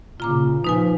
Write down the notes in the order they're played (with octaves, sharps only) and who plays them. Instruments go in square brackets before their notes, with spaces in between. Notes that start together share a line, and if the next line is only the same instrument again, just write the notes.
[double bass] A#2 C#3 [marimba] F4 A#5 D6
[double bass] F3 [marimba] D#4 B4 G#5